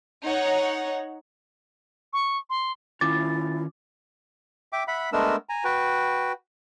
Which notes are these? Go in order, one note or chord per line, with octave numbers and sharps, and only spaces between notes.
D#4 C#5 F#5
C#6
C6
D#3 C#4 E4 F4 D6 A6
E5 G5 D6
E5 F#5 B5
G#3 A3 B3 D4 A#4 E6
G#5 A#5
F#4 B4 G5